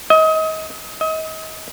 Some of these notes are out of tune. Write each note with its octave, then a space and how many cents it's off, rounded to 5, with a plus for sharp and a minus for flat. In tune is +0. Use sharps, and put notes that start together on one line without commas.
D#5 +30
D#5 +35